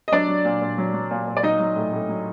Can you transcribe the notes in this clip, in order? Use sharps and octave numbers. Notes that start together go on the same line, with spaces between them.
D#5
F#3 D4 D5
F#3
A#2
A#2
F#3
F#3
A#2
A#2
D5
F#3 D#4 D#5
F#3
A2
A2
F#3